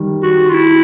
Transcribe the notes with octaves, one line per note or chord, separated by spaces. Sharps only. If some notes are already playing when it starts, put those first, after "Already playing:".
Already playing: D#3 G3
F#4
F4
E4